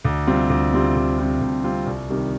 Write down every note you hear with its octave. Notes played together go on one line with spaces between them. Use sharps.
D2
C3 G3 C4 F4
D2
C3 G3 C4 F4
D2
C3 G3 C4 F4
D2
C3 G3 C4 F4
C2
C3 D#3 G3